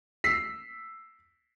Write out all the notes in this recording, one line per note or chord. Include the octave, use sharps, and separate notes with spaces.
E6 B6 C7